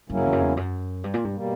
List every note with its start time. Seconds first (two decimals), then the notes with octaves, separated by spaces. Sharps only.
0.09 G2 C#3 F#3 A#3 C#4 E4
0.17 F#2
0.25 E2
0.33 F#2
0.41 E2
0.57 F#2
1.04 G2
1.14 A#2
1.24 G2
1.34 B2 G3 A#3